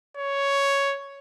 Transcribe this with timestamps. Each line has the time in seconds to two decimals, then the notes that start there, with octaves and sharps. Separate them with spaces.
0.17 C#5